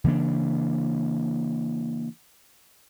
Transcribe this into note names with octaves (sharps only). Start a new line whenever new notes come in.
C#3 E3 A#3 D4